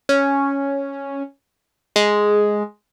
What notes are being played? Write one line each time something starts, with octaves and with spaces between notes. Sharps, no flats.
C#4
G#3